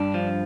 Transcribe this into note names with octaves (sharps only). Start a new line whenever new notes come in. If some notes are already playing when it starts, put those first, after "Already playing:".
Already playing: G2 D4
F3